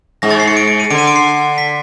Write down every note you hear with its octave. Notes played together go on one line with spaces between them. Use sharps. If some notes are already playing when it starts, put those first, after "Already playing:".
G#2 A#6
A6
C7
C#7
D7
D7
D#7
D3 D7
D#7
D7
C7
B6